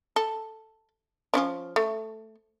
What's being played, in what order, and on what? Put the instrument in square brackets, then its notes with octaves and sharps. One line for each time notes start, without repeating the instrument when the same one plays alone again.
[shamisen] A4
F3 C#4 D4
A3